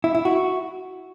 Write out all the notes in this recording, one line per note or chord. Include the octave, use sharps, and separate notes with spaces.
E4
E4
F#4